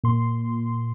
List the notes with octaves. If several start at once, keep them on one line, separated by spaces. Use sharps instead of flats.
A#2 C6